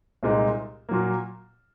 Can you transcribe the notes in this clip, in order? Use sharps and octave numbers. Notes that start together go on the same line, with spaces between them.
C2 A#2 G#3 C4 D#4
A#2 F#3 A#3